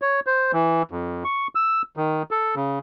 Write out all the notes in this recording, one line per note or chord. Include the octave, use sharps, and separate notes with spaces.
C#5
C5
E3
F2
C#6
E6
D#3
A4
C#3